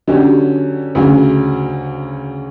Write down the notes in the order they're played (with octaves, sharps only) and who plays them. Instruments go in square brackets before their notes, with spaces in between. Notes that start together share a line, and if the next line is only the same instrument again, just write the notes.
[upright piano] D3 F#3 C#4 G4
D2 C#3 F#3